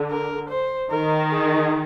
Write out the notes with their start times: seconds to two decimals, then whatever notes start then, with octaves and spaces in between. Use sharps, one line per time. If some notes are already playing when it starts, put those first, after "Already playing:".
Already playing: D3
0.10 A#4
0.50 C5
0.90 D#3 A#4
1.31 G#4